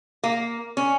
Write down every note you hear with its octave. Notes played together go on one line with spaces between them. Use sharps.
A#3
C#4